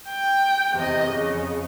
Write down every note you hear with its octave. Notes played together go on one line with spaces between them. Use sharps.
G5
E2 C3 D#5
F2 C#3